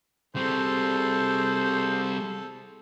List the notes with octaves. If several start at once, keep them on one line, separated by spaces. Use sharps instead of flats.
G3 C4 G#4 A4 C5